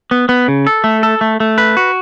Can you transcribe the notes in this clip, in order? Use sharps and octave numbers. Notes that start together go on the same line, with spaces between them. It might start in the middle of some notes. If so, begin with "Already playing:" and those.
B3
B3
C#3
A4
A3
A4
A3
A3
B4
F#4